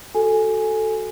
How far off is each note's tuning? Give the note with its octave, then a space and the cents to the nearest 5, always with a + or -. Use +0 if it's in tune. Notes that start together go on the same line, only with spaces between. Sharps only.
F#4 +10 A4 +0 G#5 +0